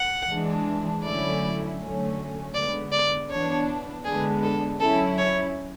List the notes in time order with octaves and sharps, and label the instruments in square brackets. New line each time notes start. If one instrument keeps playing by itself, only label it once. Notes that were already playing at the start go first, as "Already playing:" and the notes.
Already playing: [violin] F#5
[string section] E3 G#3 D4
[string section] D3 F#3 A3 C#4 E4 [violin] D5
[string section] D3 F#3 A3 C#4
[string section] D3 G#3 B3 [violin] D5
[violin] D5
[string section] E3 B3 D4 [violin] C#5
[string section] D3 G#3 B3 D4 [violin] G#4
[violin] A4
[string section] F#3 C#4 E4 [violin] A4
[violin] C#5